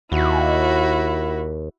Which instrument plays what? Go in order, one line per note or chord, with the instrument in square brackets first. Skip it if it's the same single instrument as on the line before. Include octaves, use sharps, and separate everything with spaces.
[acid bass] D#2 [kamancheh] E4 F#4